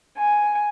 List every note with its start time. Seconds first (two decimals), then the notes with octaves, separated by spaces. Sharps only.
0.17 G#5